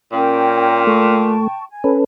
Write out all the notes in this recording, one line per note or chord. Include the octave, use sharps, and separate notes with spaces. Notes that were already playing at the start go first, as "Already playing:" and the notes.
A#2 C#4 A#4 G5
A3 G5 A5 C#6
G#5
C#4 A4 B4